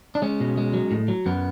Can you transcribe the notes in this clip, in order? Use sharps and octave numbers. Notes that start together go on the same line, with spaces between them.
D4
G#3 C#4
B2
G#3
F#3
A2
F#3
F#2 B3